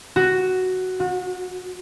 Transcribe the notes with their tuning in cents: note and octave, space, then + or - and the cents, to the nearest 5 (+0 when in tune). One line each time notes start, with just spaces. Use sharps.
F#4 +5
F#4 -30